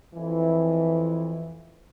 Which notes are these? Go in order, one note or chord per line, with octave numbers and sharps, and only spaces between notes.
F2 E3